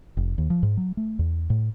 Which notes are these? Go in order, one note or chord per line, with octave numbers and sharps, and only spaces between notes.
F1
D#2
F3
G#2
F#3
A3
E2
A2